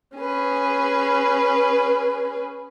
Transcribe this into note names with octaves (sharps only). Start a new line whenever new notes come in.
C#4 G#4 B4